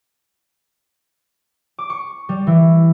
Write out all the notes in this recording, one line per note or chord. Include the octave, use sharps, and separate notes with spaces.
D6
C#6
G3
E3